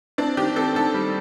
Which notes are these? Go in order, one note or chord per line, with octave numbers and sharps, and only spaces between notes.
C4 D4
D#3 G4
C4 A4
D#3 A4
G3